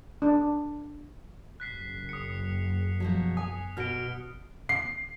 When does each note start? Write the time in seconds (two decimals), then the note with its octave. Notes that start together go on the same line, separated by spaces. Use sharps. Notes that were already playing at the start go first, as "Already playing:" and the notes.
0.22 D4
1.60 F#1 F#2 F#6 B6 C7
2.09 D#6 C#7
3.00 B2 F3 F#3
3.37 G#5 D#6
3.77 B2 F#4 F6 D7
4.69 C7